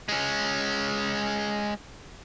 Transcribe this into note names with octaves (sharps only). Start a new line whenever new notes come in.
G#3 C#4